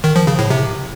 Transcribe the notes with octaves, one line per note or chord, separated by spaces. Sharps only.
D#3
F3
C#3
A2
C3